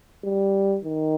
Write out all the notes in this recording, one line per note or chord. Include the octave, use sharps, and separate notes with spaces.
G3
D#3